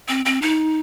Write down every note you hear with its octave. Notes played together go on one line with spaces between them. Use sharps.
C4
C4
D#4